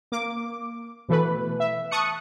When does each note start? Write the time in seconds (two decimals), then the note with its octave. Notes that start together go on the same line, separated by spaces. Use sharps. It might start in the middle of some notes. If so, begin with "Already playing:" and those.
0.12 A#3 D6
1.09 B2 E3 A3 B4
1.60 E5
1.91 A5 C#6 D#6 F#6 C#7